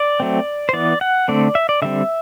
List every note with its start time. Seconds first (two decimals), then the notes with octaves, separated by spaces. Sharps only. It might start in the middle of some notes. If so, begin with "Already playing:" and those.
Already playing: D5
0.20 F#3 A3 C4
0.69 C5
0.73 E3 B3 D5
1.01 F#5
1.28 D3 A3 C4 D5
1.55 E5
1.69 D5
1.82 D3 G3 C4 E5